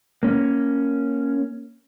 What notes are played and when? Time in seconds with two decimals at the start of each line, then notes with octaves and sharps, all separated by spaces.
0.23 A#3 C#4